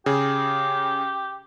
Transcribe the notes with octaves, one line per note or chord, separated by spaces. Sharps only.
C#3 G4 G#4